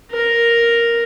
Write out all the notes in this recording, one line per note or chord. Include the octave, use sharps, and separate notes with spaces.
A#4